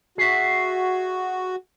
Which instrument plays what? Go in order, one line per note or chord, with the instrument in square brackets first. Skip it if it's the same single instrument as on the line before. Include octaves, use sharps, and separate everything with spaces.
[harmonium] F#4 [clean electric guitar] G#4 E5